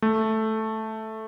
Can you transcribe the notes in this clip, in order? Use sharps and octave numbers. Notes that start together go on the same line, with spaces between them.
A3